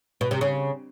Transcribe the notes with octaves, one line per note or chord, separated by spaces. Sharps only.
B2
C3
C#3